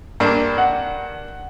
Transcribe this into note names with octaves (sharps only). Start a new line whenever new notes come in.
G2 A#3 D4
F#5